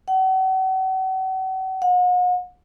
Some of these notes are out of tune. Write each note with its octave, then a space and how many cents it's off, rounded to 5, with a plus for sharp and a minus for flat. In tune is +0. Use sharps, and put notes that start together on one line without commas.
F#5 +40
F#5 -40